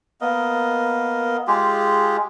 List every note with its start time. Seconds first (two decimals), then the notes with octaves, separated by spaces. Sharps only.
0.21 A#3 B3 A#4 D#5
1.47 G#3 F4 G4 G#4